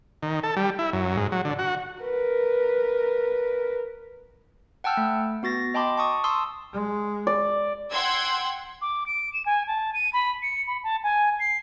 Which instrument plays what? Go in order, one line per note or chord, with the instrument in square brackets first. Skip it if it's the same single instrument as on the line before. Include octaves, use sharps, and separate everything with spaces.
[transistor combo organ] D#3
A4
G3
E4
F#2
G#2
F#3
D3
F#4
[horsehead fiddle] A#4 B4
[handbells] F#5 G5 A5 E6 F6 G6
A3
B3 F#4 A6 A#6
D#5 G5 A5 B5 C6 D6
A5 C#6 D#6
A5 C6 D#6 E6
[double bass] G#3
[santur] D5
[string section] F#5 G5 C6 E6 G#6
[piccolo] D6
D7
E7
G#5
A5
D#7
B5
C#7
B5
A5
G#5
C7